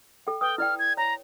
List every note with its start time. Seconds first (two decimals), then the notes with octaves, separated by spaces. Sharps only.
0.27 A4 G5
0.41 B4 G5 D#6
0.58 E4 D5 G5 F6
0.79 G#6
0.97 C#5 A#5